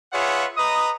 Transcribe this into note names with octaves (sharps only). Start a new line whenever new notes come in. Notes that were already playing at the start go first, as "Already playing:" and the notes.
F4 G#4 B4 C#5 E5 F#5
B4 D#5 A#5 D#6